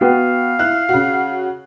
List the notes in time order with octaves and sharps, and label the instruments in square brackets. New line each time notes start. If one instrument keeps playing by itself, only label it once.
[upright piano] B3 F#4 G5 [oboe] F5
[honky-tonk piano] E4 [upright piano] F#6
[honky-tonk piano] C#3 F#4